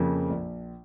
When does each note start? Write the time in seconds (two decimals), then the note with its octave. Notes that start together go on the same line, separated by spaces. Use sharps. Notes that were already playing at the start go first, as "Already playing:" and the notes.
Already playing: F2 C#3 F3 A#3
0.30 A#1